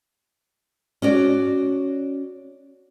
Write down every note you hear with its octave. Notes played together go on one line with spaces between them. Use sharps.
C#4 F#4 D5